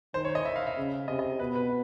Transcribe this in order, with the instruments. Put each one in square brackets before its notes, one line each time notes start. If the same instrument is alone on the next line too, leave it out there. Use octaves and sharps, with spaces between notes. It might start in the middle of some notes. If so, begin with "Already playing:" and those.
[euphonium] D#3 [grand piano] C5
[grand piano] C#5
D#5
E5
F5
E5
[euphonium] C#3
[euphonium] C3 [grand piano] D#5
[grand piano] D#5
[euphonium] B2 [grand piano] B4
[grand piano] B4